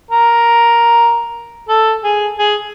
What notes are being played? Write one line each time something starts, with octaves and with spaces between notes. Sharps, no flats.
A#4
A4
G#4
G#4